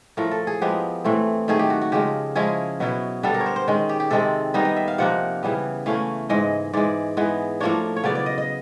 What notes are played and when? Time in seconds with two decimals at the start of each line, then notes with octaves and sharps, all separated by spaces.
0.17 A2 F3 A3 A#4
0.31 A4
0.47 G#4
0.61 F3 G#3 B3 G4
1.04 A2 E3 A3 C4
1.48 D#3 F#3 A3 G#4
1.59 G4
1.70 F#4
1.81 F#4
1.92 C#3 F3 G#3 G4
2.35 F3 G#3 C#4 E4 G#4
2.80 B2 F#3 B3 E4
3.23 D3 G3 B3 D4 A4
3.34 A#4
3.41 C#5
3.46 C5
3.56 C5
3.68 D#3 G#3 C#4
3.89 G4
4.00 G4
4.10 C3 D#3 G#3 C4 A4
4.54 D#3 G3 B3 D#4 D#5
4.65 D#5
4.76 E5
4.88 F5
4.98 C3 F3 A#3 D#4 F#5
5.43 C#3 E3 G3 B3
5.86 E3 A3 C#4 F5
6.29 G#2 E3 G#3 D#5
6.73 G#2 E3 G#3 D5
7.17 E3 G#3 B3
7.60 A2 F3 A#3 D4 C#5
7.96 C#5
8.04 C#3 F#3 B3 D5
8.15 D5
8.26 D#5
8.38 D#5